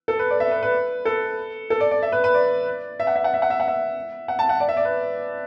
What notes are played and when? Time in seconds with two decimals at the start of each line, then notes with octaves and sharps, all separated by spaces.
0.08 A4
0.19 B4
0.30 D5
0.40 E5
0.51 B4
0.63 B4
1.05 A4
1.70 A4
1.80 D5
1.91 D5
2.03 E5
2.12 B4
2.24 B4
2.34 D5
3.00 E5
3.07 F#5
3.16 E5
3.24 F#5
3.34 E5
3.42 F#5
3.50 E5
3.60 F#5
3.68 E5
4.28 F#5
4.39 A5
4.49 F#5
4.60 D5
4.69 E5
4.77 D5
4.85 B4